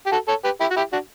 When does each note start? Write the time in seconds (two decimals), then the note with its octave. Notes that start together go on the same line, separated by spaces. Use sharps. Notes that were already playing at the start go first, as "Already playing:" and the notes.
0.06 G4
0.12 F#4 A4
0.28 A4 C#5
0.44 G4 B4
0.60 E4 G4
0.71 F#4
0.76 E4 G4
0.93 D4 F#4